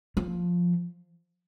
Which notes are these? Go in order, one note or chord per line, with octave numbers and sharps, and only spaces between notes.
F3